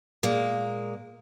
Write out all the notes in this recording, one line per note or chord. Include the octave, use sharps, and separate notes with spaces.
A#2 G#3 A#3